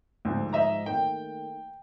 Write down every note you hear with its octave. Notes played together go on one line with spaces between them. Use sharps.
D2 G#2 F3
D#5 E5 A#5
D#3 A3 A#3 G5